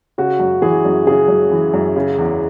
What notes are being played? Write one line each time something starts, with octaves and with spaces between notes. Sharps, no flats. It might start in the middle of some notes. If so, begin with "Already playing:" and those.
C#3 F#4
F#2
E3 G#4
F#2
C#3 G#4
F#2
E3
F#2
C#3
E2